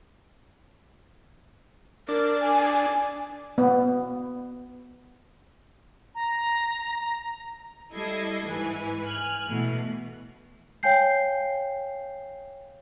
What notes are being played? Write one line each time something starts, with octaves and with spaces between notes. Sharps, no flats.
D4 A#4
G#5
B3
A#5
G3 E4 A4 D#5 G#6 C7
G#2 E3 B4 G#5
G#5 F6 F#6
B2 E3 A3
C#5 F5 G5 G#5 G6 C7